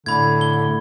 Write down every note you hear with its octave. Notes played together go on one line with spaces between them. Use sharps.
A2 D3 B5 G#6
G7